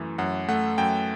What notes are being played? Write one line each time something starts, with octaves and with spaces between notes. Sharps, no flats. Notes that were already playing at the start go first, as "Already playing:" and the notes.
Already playing: F#2 E3 A3
F#2 F#5
A3 F#5
F#2 G5